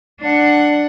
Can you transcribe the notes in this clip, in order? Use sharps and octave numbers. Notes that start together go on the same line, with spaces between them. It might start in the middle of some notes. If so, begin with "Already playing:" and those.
D4 F#5